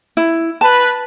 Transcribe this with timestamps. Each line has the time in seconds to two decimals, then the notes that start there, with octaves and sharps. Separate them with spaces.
0.17 E4
0.61 B4 A5